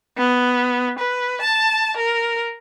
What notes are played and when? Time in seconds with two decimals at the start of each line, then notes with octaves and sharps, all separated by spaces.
0.17 B3
0.99 B4
1.42 A5
1.97 A#4